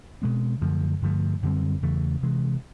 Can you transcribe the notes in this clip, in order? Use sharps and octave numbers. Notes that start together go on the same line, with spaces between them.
B2 G#3 C4
F#2 D3 F3 A3
G2 D3 F3 A3
F#2 D3 G3 C4
E2 C#3 E3 A3
C3 E3 G#3